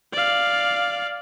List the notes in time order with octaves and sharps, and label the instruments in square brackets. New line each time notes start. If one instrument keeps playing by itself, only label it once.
[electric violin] D5 F5